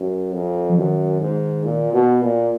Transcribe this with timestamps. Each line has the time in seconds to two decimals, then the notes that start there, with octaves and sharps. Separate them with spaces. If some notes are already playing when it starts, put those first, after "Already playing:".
Already playing: F#2
0.34 F2
0.69 F3
0.78 F#2 D#3
1.21 G#2
1.64 A#2
1.93 B2
2.22 A#2